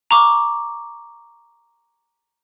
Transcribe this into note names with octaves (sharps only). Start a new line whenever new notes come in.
A#5 C#6 D6